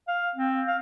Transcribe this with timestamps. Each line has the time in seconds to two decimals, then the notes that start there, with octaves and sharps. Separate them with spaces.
0.08 F5
0.35 C4
0.67 F5